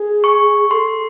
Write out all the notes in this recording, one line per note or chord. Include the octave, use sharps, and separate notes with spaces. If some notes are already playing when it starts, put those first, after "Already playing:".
Already playing: G#4
C#6
A4 C6